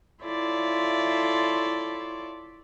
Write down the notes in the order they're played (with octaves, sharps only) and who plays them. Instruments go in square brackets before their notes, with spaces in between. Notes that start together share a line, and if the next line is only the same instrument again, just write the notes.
[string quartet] E4 F4 A4 C#5 D5 E5